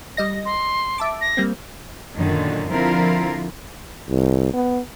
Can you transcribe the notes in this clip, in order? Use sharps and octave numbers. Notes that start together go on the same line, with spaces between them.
G3 D#5 A#6
C6
E5 A5 D6
A#6
G3 A#3 C4
F#2 A#2 D3 D#3 D4
D3 F3 C4 E4 F4 A#4
C2
B3